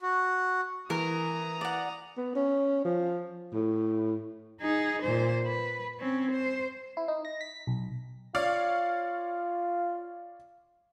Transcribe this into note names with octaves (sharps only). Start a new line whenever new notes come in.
F#4
E3 A#4 A#5 D#6
D5 F#5
B3
C#4
F3
A2
D#4 G#4
A#2 C5
B4
C4 C#4
C5
E4
D#4
A#6
B6
B1
F4 C#5 D5 F5